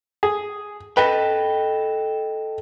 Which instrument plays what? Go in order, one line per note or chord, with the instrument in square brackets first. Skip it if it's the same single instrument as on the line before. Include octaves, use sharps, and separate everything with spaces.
[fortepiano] G#4
[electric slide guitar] A4 D#5 G5 [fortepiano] B4